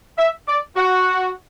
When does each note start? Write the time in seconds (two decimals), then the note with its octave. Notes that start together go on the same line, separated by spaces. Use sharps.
0.18 E5
0.47 D5
0.76 F#4